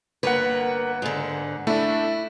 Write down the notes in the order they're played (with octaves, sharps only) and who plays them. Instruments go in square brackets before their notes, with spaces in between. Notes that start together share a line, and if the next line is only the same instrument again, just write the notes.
[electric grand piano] G1 A#3 F#5 [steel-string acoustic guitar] A#4 B4
[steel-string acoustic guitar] G#2 D3
[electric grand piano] A3 D4 [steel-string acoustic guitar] E4